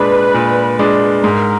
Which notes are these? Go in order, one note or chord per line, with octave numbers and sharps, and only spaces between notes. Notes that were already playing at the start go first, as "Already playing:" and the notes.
Already playing: A#2 G#3 D4 B4
A#2
G#3 D4
G#2 A#4